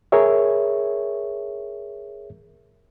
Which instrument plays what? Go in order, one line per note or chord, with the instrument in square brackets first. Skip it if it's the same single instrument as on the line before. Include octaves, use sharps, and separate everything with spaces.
[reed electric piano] G#4 A#4 C#5 E5